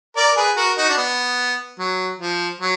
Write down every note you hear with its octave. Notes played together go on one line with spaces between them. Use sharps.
A#4 D5
G#4 B4
F#4 A#4
D#4 F#4
D4
B3
F#3
F3
F#3